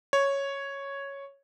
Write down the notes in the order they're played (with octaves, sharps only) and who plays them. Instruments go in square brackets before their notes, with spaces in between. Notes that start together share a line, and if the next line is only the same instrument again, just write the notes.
[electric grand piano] C#5